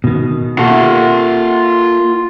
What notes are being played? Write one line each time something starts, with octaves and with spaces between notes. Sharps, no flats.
B2 D#3
A#3 F4 A4 F#5